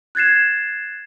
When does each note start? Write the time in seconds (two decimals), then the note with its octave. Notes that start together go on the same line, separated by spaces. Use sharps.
0.15 F#6 G#6 A6 C7 E7